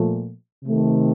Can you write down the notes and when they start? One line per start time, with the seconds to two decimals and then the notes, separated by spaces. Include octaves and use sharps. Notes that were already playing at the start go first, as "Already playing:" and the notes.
Already playing: A#2 F3 A3
0.65 C3 D#3 A3